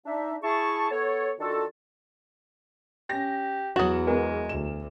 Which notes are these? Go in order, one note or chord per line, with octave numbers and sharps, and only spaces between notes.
D4 D#4 E5
E4 G#4 A5 C#6
B3 A4 C#5
D#3 D4 F4 F#4 A4
C#4 G4 A#6
E2 F#3 F#4 D#6 A6 E7
G#3 B3 A#4
D2 E7